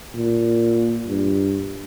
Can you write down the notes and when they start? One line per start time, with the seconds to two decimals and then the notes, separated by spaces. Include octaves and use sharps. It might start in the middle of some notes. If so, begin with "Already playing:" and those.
0.16 A#2
1.08 G2